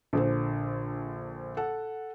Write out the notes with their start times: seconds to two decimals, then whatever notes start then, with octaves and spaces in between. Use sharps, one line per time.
0.13 A#1 D3 C5
1.57 A4 F#5